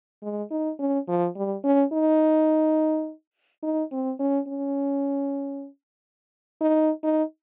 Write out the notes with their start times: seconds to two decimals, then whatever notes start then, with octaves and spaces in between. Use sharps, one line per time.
0.23 G#3
0.51 D#4
0.79 C#4
1.08 F3
1.36 G3
1.64 C#4
1.93 D#4
3.63 D#4
3.92 C4
4.20 C#4
4.48 C#4
6.61 D#4
7.04 D#4